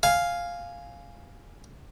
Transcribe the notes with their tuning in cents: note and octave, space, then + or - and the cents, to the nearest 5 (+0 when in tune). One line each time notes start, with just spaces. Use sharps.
F5 +0 G#5 +0